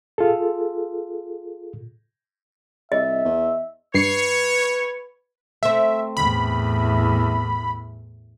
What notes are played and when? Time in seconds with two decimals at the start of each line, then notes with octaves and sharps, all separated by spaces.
0.18 F4 G#4 A4
2.92 C2 D#5 E5
3.25 E2
3.94 G2 B4 C#5 C7 C#7
5.63 A3 C4 E5
6.17 E2 A2 B5